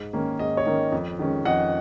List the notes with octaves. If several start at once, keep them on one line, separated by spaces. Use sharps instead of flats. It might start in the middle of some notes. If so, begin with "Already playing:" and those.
Already playing: G#2
D#3 A#3 C#4
G#2 D#5
C#5
D#3 A#3 C#4
F2
D#3 G#3 C#4
F2 D#5 F#5